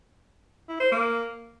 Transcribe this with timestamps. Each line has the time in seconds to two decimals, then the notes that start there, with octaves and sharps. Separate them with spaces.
0.69 E4
0.80 C5
0.92 A#3